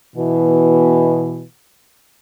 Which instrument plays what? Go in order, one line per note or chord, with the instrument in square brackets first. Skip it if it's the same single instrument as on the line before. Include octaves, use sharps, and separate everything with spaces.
[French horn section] B2 E3